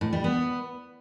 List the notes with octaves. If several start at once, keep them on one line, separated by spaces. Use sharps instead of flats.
A2
G3
B3